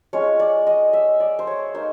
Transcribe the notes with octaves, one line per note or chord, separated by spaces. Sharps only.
G#3 C#4 F4 C#5
D5
D#5
E5
D5
C5
C#5
A#3 D#4 C5